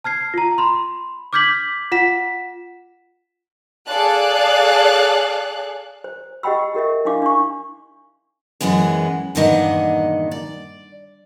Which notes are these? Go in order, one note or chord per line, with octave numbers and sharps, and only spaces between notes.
A5 F6 G#6 C7
F4 A#5
B5 C6
D6 F6 G6 G#6 B6 F#7
F4 F#5 B6 E7
G#4 A4 D5 F5 A5 F#6
C5
G4 D#5 F#5 G5 B5 E6
G4 A#4 D#5 E5
D4 E4 F5 D6
D4 E4 C#6
F#2 E3 G#3 B3 G#4
E2 G2 A#2 D#3 D#5 F#5
D5